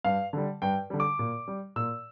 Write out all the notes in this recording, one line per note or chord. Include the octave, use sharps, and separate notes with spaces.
G2 F5
D3 G3
G2 G5
D3 G3
D6
A#2
G3
A#2 E6